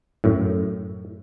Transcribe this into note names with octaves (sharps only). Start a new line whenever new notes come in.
F#2 A2